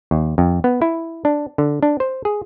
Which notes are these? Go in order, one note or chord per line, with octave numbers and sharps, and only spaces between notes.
D#2
F2
B3
E4
D4
D3
D4
C5
G#4